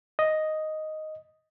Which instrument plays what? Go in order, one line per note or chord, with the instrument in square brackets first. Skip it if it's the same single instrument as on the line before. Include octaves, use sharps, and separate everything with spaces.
[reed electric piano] D#5